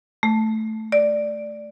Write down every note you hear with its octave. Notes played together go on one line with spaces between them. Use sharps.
A3
D5